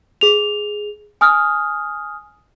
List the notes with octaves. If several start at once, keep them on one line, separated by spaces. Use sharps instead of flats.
G#4 F7
G#5 D#6 F6